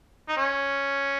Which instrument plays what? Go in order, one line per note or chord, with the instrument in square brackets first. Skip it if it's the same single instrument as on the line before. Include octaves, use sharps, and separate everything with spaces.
[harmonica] D#4
C#4